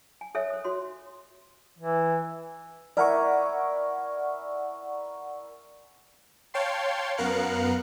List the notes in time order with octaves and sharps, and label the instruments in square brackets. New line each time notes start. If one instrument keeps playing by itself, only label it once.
[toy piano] G#5
A4 C5 C#5 E5 G#5
C5 D#6
F#4 C#5 C6
[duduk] E3
[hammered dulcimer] E4 A#4 G#5 [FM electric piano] D5 F#5 C#6
[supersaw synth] C#5 F5 G5 A5 C6
F#2 B3 A#4 F5 F#6 C#7